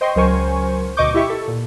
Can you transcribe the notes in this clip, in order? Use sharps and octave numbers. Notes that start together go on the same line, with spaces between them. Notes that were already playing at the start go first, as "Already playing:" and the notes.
C5 D#5 G5 C6 C#6
C#2 F#3 A#4 C5 G#5 C#6
D2 B2 D#5 C#6 D6 G6
E4 G4 E5 C#6
A4
A#2